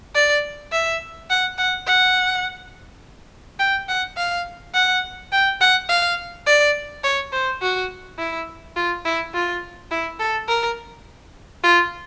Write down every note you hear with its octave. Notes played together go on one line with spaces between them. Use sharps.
D5
E5
F#5
F#5
F#5
G5
F#5
F5
F#5
G5
F#5
F5
D5
C#5
C5
F#4
E4
F4
E4
F4
E4
A4
A#4
F4